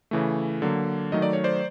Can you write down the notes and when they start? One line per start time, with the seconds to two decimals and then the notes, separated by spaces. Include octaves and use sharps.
0.11 C#3 E3 A3
0.62 D3 F#3 A#3
1.12 D#3 F#3 A3 D#5
1.22 D5
1.33 C#5
1.44 C5 D5